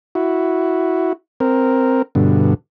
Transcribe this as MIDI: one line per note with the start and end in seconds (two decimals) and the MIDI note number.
0.15 1.13 64
0.15 1.13 66
1.40 2.02 60
1.40 2.02 70
2.15 2.54 43
2.15 2.54 47
2.15 2.54 50